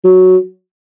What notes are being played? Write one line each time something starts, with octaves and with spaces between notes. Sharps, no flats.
F#3